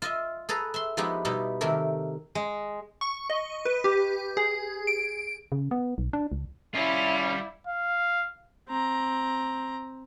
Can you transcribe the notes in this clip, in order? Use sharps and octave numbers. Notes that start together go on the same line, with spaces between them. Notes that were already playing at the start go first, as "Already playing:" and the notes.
F4 D#5 E5
G#4 A4 B4 A#5
E5 C6
F3 G#3 B3 D#4 E4 G4
B2 G3 D#4 E4
C3 D#3 A3 G4 A#4
G#3
C#6
D#5
B4
G4
G#4
D7
C#3
B3
B1
D4
C#2
G3 C#4 E4 F4 D5 F5 B5
F5
C4 A#5